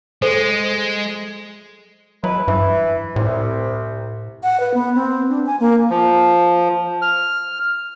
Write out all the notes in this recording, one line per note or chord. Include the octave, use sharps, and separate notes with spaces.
G#3 A4 C5
F#3 G#3 E4 B4
G2 E3
C2 A2 C3
F#5
B4
B3
C4
D4
G#5
A#3
F3
F6